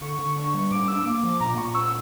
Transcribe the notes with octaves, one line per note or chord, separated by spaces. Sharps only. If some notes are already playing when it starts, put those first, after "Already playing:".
D3 C#6
D3
D4
G3
A2 D6
D4 E6
A#3 D6
F3
A#2 A#5
A#2 C#6
C#4 E6